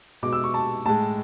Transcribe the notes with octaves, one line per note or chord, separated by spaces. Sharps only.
B2 G#3 D6
E6
C#6
A5
A2 G#3 A5